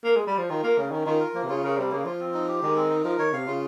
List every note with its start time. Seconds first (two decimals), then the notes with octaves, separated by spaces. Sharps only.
0.04 A#3
0.16 G#3
0.27 G3
0.38 F3
0.50 D#3 F4
0.64 A#3 A#4
0.78 C#3 C#4
0.92 D#3 C#4
1.06 D#3 F4
1.20 A#4
1.35 F3 A#3
1.44 C3
1.49 C#3 F4
1.63 C#3 A#4
1.78 C3 G3
1.91 C#3 A#3
2.05 F3 F4
2.20 C4
2.34 D#4
2.48 G4
2.62 D#3 G#3
2.76 C4
2.90 D#4
3.04 F3 A#4
3.18 D#3 C#5
3.33 C3 F5
3.47 C#3 F4